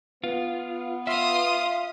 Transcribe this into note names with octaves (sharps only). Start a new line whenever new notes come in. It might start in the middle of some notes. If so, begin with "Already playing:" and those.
B3 F4
F4 E5 F5 D#6